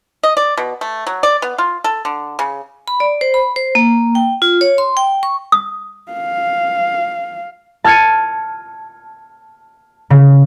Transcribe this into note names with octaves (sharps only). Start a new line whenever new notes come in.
D#5
D5
B2
A3
F#3
D5
B3
F4
A4
D3
C#3
B5
D5
C5
B5
C5
A#3
G5
F4
C#5
C6
G5
C#6
D#6
F5
A5 F6 G#6 A6 C#7 D#7
C#3